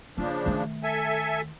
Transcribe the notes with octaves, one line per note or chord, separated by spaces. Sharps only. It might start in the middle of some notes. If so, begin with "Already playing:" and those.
C#3 F3 A#3 D4 F4
D#3 A3
A4 E5 G#5